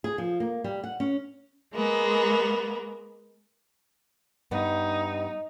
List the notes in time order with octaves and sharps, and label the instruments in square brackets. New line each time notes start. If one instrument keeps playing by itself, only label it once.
[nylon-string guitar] G#4
F3
A#3
G3
F#5
C#4
[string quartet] G#3 A#3 B3
[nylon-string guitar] G2 B3 [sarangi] D#4